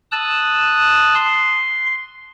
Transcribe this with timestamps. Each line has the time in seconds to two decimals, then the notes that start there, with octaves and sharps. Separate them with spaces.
0.12 A5 D#6 E6 F#6
1.15 C6